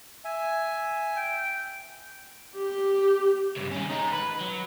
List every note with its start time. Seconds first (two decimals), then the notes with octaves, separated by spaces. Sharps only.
0.25 E5 G#5
1.17 G5
2.55 G4
3.56 G2 C#3
3.72 D#3 C#4
3.90 G#3 D#4
4.13 B4
4.41 F#3